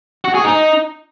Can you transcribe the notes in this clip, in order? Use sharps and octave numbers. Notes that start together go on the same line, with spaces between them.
F#4
G#4
D#4